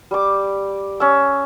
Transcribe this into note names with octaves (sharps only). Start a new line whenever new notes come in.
G3 D6
C#4 E6